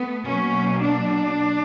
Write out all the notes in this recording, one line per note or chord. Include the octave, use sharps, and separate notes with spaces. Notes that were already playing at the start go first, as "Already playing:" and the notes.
Already playing: A3 B3
B2 F#3 A#3 C#4
D4